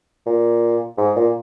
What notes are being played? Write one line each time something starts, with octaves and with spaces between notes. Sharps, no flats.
A#2
G#2
A#2